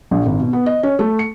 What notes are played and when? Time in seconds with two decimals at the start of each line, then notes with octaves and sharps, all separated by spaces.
0.11 A#1
0.26 G#1
0.40 B2
0.53 B3
0.66 D#5
0.83 C#4
0.99 A3
1.19 C#7